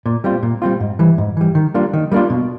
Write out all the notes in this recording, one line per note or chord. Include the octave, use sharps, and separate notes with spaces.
A#2
G3 C4 F4
A#2
G3 C4 F4
G#2
E3 G3
G#2
E3 G3
D#3
G3 A#3 D4 F4
D#3
G3 A#3 D4 F4
B2